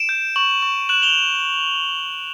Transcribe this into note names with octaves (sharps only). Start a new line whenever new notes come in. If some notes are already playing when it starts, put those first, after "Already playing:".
Already playing: D7 E7
G6
C#6 E7 F#7
C#6
F#6 E7 F#7
F7 G7